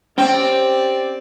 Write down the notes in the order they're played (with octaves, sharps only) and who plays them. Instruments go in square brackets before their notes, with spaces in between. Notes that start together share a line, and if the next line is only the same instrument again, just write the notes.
[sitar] C4 [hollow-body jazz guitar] C#4 G5 [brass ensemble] G4 D5